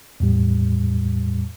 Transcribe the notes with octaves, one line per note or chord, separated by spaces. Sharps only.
E2 A2 G3